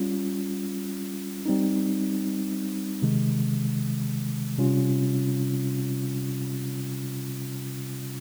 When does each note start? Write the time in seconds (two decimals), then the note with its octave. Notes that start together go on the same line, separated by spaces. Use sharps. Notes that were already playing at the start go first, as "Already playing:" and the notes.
Already playing: G3 C#4 F4
1.46 G3 C4 D#4
3.02 C3 D#3 G#3
4.58 C3 G3 C#4 F4